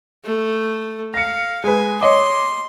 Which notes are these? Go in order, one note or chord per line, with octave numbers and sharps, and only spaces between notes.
A3
F5 A#6 C#7
G#3 B4 G#5
C#5 D#5 C6 D6